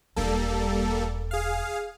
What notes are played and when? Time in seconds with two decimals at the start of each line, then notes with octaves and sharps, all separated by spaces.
0.16 E1 G3 A#3 D#4 A4
1.31 G#4 F5